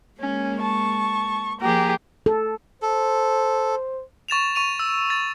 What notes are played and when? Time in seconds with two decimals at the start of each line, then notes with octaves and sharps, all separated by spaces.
0.21 G#3 A#3 C#4
0.62 A5 C#6
1.61 F3 A#3 G4 G#4 A#4
2.26 A4
2.82 A4 C5
4.28 C#6 A6 E7 F7
4.55 C#6 D#7 F7
4.79 E6
5.10 A6